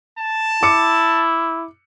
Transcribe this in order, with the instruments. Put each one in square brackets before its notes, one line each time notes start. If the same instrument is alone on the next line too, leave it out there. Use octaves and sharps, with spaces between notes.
[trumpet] A5
[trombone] E4 [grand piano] D6 C#7